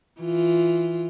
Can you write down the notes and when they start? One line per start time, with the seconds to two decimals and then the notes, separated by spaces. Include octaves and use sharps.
0.20 E3 F4